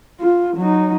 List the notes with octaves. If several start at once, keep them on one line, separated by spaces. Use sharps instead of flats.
F4
F#3 D#4